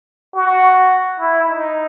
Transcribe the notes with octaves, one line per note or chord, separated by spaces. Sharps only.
F#4
E4
D#4